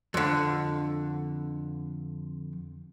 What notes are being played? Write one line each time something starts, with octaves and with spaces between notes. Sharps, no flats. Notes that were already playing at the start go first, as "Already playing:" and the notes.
F2 D3